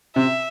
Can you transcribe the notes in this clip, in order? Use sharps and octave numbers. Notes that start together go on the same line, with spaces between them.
C3 E5